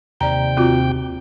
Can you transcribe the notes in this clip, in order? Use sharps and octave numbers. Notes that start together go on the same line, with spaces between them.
D#2 C3 D5 G5 A#5
C4 F4 F#4